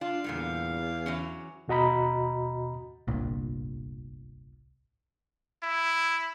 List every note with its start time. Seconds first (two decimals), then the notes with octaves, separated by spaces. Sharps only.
0.01 D4 F4 F5
0.24 E2 A#2 D3 G3
1.06 E3 F#3 C#4
1.68 D#2 B2 F#4 D#5 A#5 B5
3.07 D1 G1 C2 A#2
5.63 E4